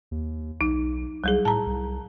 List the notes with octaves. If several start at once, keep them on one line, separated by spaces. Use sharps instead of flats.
D#2
B1 D#4
C2 F#3 G3 G#4
A2 A5 A#5
C2